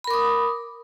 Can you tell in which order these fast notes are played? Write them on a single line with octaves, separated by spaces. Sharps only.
B5 A#4 D6 D#6